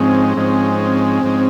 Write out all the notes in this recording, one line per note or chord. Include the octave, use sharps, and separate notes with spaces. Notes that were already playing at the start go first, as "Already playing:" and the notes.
Already playing: G#2 F3 G#3 C4 C#4
G#2 F3 G#3 C#4
G#2 F3 G#3 C#4